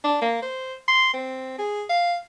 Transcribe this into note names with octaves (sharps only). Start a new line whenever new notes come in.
D4
A#3
C5
C6
C4
G#4
F5